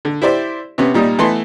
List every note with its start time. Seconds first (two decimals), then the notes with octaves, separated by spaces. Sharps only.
0.05 D3
0.22 E4 G4 C5 D5
0.78 C3 B3 C#4
0.94 A#2 G3 D#4
1.19 E3 A3 B3 A5 C6